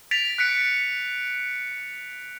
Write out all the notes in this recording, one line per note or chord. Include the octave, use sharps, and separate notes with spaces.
A6 B6 D7 F7
F#6 B6 C#7 D7